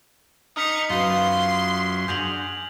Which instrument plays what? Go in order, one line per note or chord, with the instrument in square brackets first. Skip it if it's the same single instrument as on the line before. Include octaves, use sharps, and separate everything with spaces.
[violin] D#4 C#7 [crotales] D#6 F6 B6
[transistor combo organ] F#2 [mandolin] F4 B4 [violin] C6
[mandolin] D4 F#4 G#4 [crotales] G6 F7 F#7